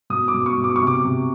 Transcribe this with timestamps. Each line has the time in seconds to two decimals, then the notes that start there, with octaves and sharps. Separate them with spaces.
0.10 B2 D#6
0.28 D6
0.34 B2
0.46 C#6
0.58 B2
0.64 D6
0.76 C#6
0.81 C3
0.87 D6
1.05 C3